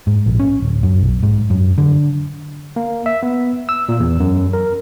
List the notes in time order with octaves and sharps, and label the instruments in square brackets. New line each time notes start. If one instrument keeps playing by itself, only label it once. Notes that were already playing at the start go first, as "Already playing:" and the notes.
[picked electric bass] G#2
A#1
C#4
D1
F#2
B1
G#2
F#2
D3
[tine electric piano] A#3
E5
B3
E6
A#2
E2
F#2
A#4